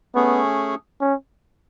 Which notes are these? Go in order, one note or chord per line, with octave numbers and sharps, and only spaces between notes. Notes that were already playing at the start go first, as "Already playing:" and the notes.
A3 B3 C#4 G#4
C#4